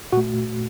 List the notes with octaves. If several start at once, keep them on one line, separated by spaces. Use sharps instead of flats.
A#2 A3 F#4